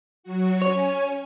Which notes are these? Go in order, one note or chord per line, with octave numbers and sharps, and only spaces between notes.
F#3 F#4
C#4 C#5 G#5